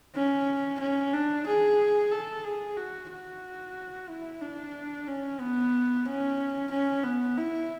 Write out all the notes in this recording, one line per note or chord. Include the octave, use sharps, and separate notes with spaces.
C#4
C#4
D4
G#4
A4
G#4
F#4
F#4
E4
D4
C#4
B3
C#4
C#4
B3
E4